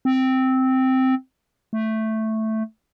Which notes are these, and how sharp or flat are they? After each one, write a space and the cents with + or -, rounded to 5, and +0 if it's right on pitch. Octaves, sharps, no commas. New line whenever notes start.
C4 -5
A3 +0